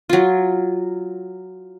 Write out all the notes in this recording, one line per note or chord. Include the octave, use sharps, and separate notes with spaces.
F#3 F4